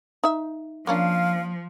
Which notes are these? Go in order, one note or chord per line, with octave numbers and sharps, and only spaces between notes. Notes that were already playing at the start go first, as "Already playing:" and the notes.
D#4 E5
F3 A#3 C#4 D4 F5